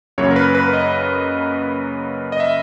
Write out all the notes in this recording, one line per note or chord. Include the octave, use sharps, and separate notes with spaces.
F#2 C#3 F#3 A#3 C#5
A#4
B4
B4
D#5
D#5
E5